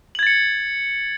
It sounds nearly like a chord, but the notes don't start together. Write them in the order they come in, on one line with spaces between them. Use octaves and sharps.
F#7 G#6 A6 C#7